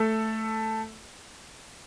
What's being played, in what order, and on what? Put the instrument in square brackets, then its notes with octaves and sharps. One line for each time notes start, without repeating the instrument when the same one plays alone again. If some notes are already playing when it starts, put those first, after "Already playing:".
Already playing: [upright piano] A3 A4